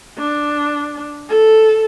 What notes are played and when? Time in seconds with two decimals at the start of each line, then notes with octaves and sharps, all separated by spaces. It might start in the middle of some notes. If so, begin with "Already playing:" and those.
0.18 D4
1.29 A4